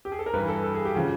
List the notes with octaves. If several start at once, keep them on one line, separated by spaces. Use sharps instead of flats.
G4
G#4
A4
A#4
G2 E3 B4
A4
A4
G#4
G4
C#3 F3 F#4